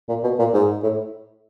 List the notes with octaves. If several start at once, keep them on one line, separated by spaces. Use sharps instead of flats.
A#2
B2
A#2
G#2
A2